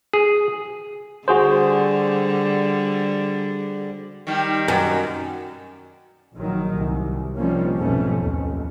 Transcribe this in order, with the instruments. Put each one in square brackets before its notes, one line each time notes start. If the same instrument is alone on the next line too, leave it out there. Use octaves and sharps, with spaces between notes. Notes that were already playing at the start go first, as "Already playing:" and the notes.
[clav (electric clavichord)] G#4
[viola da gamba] D3 G3 [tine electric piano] F#4 G#4 C5
[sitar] D#3 G3
[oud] F#2
[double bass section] A#1 D#3 F#3
C2
C3 D#3 F3 G3 A#3 C#4
B1 F2 G#2 B2 A3 C#4
D#2